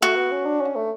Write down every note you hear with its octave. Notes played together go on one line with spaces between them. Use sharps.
A3 F#4
B3
C#4
D4
C#4
A3